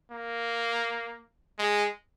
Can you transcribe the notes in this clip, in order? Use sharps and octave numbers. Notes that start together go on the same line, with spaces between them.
A#3
G#3